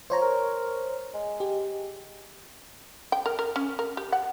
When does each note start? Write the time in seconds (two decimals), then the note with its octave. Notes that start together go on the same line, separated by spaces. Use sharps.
0.10 F3 C5 C#5 A#5
0.22 A#4
1.14 G#3
1.40 G4
3.12 G5
3.26 A#4
3.39 A#4
3.56 C#4
3.79 A#4
3.97 G4
4.12 F#5